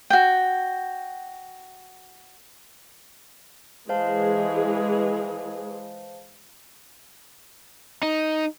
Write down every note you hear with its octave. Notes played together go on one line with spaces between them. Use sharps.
F#4 G5
E3 G#3 G#4 C5 F5 A5
D#4